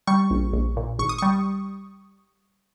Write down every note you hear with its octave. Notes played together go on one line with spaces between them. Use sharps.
G3 C#6
A#1
A#1
A#2
G#1 C#6
D#6
G3 C#6